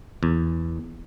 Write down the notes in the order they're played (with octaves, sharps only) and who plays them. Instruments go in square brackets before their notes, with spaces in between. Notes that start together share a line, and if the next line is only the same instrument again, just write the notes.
[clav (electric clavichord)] E2